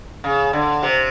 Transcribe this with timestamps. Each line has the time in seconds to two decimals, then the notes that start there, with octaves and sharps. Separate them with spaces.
0.24 C#3
0.53 D3
0.83 C3